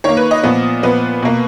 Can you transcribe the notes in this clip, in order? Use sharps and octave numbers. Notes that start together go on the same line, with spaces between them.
D#3 A#3 C#5
B4
D#5
A#2 F3 B3
A#2 F3 B3 B4
B2 A#3